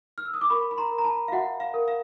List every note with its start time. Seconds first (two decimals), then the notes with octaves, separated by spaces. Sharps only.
0.18 F6
0.25 E6
0.34 D#6
0.41 D6
0.50 A#4 B5 C#6
0.71 B5
0.78 A#5 C6
0.91 A#4
0.98 A#5
1.05 A5 B5
1.28 F5
1.32 F#4 E5 F#5
1.60 F5
1.74 A#4
1.88 F5